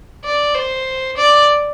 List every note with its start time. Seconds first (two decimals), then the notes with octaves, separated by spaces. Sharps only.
0.24 D5
0.54 C5
1.17 D5